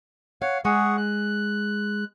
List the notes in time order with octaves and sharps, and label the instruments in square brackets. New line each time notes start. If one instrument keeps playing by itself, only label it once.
[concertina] C#5 F#5 [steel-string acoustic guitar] F5
[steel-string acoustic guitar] G#3 [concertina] G#4 F#5 C#6
[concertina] F#6